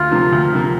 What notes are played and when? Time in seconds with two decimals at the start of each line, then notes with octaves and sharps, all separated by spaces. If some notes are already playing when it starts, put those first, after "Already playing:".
Already playing: D2 F4
0.11 C3 F3 A#3
0.32 D2
0.52 C3 F3 A#3